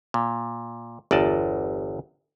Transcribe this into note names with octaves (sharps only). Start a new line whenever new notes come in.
A#2
G1 E2 D5 D#5 A5